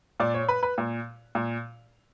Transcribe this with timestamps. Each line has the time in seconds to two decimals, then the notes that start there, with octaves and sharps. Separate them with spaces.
0.20 A#2 D5
0.34 C#5
0.48 B4
0.63 B4
0.78 A#2
1.35 A#2